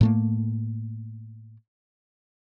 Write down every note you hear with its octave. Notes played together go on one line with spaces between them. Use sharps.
A2 A3 A#3